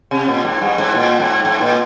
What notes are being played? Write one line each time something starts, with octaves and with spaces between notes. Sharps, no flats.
C3
A#2
G#2
G2
G#2
A#2
G#2
G#2
A#2